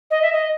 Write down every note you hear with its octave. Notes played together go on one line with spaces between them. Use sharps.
D#5
E5
D#5